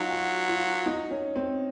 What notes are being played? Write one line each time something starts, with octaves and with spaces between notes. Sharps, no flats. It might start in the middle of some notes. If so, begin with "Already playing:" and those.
Already playing: F#3 D#4 F4
F#4
F4
D#4
C#4
C4